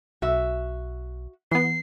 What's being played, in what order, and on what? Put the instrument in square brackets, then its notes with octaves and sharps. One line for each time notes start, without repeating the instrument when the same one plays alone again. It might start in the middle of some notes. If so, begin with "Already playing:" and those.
[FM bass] B1 [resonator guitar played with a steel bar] F#4 E5
[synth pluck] E3 B3 [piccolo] C7